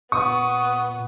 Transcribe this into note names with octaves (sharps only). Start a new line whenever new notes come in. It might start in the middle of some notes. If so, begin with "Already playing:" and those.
A#2 B3 C#6 D#6